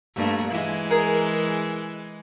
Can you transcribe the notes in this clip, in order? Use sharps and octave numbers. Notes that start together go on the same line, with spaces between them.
G2 A3 A#3
E3 G#3 E4
G#4 A#4